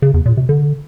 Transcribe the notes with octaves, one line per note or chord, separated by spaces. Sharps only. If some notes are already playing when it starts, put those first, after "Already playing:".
C#3
E2
A#2
C3
D3